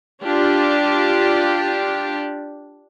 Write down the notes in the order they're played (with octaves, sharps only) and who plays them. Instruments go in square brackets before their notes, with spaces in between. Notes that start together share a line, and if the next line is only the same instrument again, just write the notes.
[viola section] D4 F4 G4